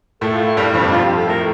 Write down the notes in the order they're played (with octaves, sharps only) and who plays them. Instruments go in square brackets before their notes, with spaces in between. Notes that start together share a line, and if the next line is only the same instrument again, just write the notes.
[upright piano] A2 A3 [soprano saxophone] A4
[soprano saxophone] F4
E4
[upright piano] G2 G3
[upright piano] F2 F3 [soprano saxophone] D4
[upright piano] F2 F3 [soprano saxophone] F4
[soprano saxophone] G4
A4
[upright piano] A2 A3 [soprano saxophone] A#4